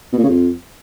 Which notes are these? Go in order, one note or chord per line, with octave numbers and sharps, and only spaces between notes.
B2
A#2
C#3
F2